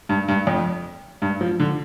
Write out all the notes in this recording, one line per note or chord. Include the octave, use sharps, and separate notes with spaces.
G2
G2
F2
G2
F3
D3